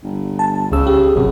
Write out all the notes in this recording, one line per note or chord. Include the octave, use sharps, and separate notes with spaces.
G1
A5
C#2 C#3 E6
G4
G#1 F#2 C3